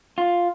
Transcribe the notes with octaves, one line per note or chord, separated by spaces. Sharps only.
F4